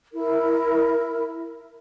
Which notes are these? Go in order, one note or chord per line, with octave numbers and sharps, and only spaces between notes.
E4 A#4